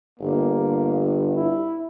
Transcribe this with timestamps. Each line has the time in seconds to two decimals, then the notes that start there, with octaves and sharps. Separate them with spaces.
0.20 G1 A#3
1.35 E4